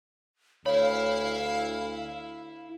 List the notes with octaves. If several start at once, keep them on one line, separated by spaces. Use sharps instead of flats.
D2 E4 C#5 F5 B5